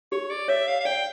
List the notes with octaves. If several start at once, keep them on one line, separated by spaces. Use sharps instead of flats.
G4 C#5
D5
C#5 E5
F5
F5
D5 G5